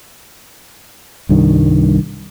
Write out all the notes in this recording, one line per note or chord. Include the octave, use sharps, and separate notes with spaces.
C2 G2 D#3